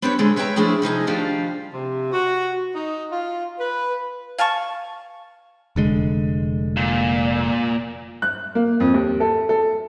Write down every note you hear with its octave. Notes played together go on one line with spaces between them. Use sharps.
B3 C4 D4 G4 B4 C#5
A#2 D3 G#3 C4
B4 C#5 E5 G5 G#5 A#5
F3 A3 D4 E4 G#4
C3 F3 D#4 G#4
D#3 F3 G3 D4 F4 F5
C3
F#4
D#4
F4
B4
F5 G#5 A5 C#6
F1 D3 G#3
A#2
F#6
A#3
F2
D#2
A4
A4